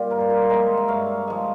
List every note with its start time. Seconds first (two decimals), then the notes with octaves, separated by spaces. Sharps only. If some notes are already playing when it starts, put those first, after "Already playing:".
Already playing: A#2 G3 F4 G4 F5
0.10 G2 A#4
0.20 C5
0.30 G4 A#4
0.49 F3 G#3 G4 A#4
0.77 E5
0.88 G2 C#5 F5
1.27 F3 G#3